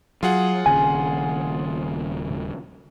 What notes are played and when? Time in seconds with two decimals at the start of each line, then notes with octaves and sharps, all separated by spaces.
0.23 F#3 F4 G#4 F#5
0.66 D#1 D#2 C#3 G#5